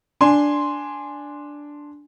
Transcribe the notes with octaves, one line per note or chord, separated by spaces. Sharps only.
D4 G#5 C6